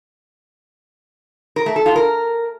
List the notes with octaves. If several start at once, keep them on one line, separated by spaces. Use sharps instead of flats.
A#4
A3
A4
F4
A#4